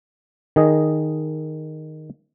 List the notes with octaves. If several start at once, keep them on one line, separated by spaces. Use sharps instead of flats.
D#3 G#4 D#5